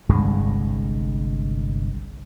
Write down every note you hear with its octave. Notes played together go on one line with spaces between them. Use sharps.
G1 C2 G2 G#3